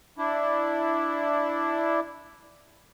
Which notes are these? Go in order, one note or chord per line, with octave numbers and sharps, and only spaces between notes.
D4 E4